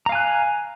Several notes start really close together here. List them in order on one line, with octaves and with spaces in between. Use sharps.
A#5 F5 G#5 F#6